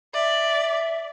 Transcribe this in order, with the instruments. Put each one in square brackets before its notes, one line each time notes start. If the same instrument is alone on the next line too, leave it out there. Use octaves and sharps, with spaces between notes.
[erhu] D5 [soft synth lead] E5